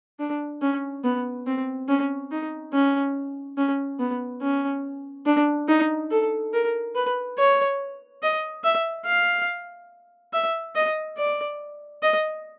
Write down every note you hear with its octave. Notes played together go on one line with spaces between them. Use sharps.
D4
C#4
B3
C4
C#4
D#4
C#4
C#4
B3
C#4
D4
D#4
A4
A#4
B4
C#5
D#5
E5
F5
E5
D#5
D5
D#5